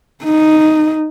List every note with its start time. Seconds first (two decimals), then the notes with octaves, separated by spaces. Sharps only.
0.24 D#4